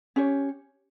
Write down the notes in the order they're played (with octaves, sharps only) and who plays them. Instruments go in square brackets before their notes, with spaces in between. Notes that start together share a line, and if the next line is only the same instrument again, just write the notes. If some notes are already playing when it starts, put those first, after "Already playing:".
[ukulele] C#4 G4 C#5